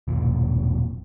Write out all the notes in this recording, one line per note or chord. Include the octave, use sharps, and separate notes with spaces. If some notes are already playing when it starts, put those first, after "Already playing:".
E1 B1 A#2